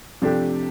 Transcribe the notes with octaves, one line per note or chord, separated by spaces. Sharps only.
C3 F3 A3 D4 G4